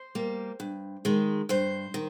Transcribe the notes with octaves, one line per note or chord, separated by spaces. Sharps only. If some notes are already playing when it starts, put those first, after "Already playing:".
Already playing: C5
G3 A#3
G2
D#3 G#3
G2 C5
D#3